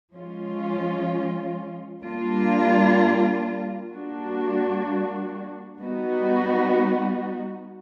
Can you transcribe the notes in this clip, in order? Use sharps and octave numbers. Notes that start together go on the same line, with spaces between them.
F3 G#3 C#4 F4
G3 A#3 D4 F4
G3 A#3 D4 F#4
G3 B3 D#4 F#4